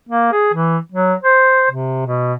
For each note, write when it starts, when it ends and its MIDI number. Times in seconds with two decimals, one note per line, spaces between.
0.09 0.32 58
0.32 0.53 68
0.53 0.78 52
0.92 1.14 54
1.22 1.71 72
1.71 2.06 48
2.06 2.34 47